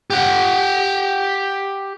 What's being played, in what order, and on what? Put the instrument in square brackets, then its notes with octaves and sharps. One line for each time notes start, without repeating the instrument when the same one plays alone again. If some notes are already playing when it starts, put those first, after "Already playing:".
[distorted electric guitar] G4 F#5